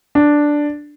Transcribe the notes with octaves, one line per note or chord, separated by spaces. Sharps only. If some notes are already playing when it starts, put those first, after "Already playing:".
D4